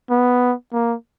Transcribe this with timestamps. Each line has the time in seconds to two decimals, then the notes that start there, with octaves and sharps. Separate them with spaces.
0.10 B3
0.73 A#3